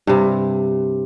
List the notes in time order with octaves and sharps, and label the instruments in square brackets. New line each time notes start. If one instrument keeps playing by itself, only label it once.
[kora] G2 C3